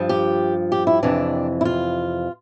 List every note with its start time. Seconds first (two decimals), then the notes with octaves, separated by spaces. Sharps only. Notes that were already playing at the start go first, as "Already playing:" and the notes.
Already playing: G2 F3
0.09 G4
0.72 G4
0.87 E4
1.03 F2 C3 E3 D4
1.61 E4
1.65 F4